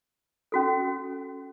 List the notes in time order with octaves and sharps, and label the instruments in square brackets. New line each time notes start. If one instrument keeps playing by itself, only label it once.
[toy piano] C#4 F#4 A4